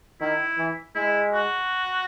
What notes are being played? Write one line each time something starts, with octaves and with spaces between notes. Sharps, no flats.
D#3 E4
E3
G#3 E4
F#4